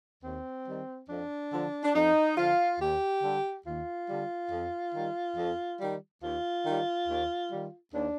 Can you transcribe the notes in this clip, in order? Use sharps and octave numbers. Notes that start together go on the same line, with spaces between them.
D#2 C4
D#3 G3
F2 D4
D3 F3
D4
F2 D#4
D3 F3 F4
D#2 G4
D3 G3
D#2 F4
D3 G3
F2
D#3 G3
F2
D#3 G3
D#2 F4
D#3 G3
D#2
D#3 G3
D#2 D4